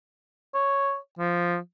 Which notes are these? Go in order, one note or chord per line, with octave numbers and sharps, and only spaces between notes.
C#5
F3